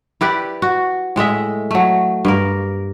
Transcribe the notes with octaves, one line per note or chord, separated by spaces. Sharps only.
E4 G4 B4 D5
F#4
A2 G#3 D#5 E5
F#3 A3
G2 A#3 A#4